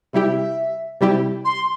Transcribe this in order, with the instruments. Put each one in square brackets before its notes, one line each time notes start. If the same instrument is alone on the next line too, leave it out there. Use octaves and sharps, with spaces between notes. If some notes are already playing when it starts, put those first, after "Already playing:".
[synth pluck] C3 G3 E4 G4 [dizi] E5
[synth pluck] C3 G3 E4 G4
[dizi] C6